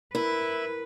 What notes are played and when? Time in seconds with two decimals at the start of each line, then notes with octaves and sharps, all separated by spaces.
0.15 E4 A#4 B4